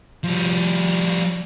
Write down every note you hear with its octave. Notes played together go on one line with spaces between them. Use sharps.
F3 G3